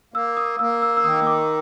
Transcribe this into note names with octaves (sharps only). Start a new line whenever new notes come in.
A#3 E6
D#6
A#3 E6
E6
E6
D#3 D#6
D6